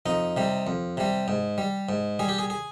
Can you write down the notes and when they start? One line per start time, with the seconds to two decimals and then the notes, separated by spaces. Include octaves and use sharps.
0.06 F2 D#4
0.37 C3 G3
0.67 F2
0.97 C3 G3
1.28 G#2
1.58 G3
1.89 G#2
2.19 G3 G#4
2.29 G4
2.39 G#4
2.50 G#4